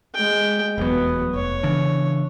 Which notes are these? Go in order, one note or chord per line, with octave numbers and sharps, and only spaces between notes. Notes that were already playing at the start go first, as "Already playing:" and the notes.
G#3 G5
F1 E2 F#3 B3
F1 C#5
C#3 E3 D4